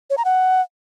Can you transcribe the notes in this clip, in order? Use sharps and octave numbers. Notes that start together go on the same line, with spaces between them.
C#5
A#5
F#5